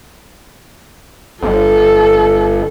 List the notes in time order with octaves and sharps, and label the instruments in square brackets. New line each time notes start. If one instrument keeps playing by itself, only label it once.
[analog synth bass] G1 [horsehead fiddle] A4